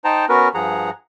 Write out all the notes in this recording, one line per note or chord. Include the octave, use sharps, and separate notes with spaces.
D#4 C5 G5 A5 A#5
B3 C#4 F#4 A#4 B4
G2 F3 G#4 F#5 A#5